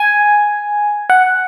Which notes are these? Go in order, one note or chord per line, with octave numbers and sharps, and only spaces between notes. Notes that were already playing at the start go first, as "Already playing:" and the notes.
Already playing: G#5
F#5